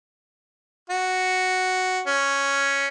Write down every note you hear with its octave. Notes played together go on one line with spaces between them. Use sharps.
F#4
C#4